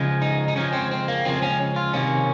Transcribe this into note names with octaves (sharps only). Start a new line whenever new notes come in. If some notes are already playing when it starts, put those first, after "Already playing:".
Already playing: C#3 F3 G#3
D#4
D#4
C#3 F3 G#3 C#4
C4
C4
A#3
C#3 F3 G#3 C4
C#4
F4
C3 D#3 A#3 C#4